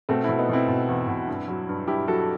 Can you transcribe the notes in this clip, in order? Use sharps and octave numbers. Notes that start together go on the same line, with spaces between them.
B2 A3 C4
B2 C4 E4
B3 D#4
B2 C4 E4
B2
E2
B2
G2
F#3
G2
G2 E4 G4
F#3 F#4 A4